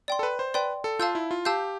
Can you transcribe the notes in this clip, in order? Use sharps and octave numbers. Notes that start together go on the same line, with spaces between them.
D5 G5 C6
A4
B4
C5
B4 D5 G5 C6
A4
F4 F5 A5 E6 G6
E4
F4
G4 F5 A5 E6 G6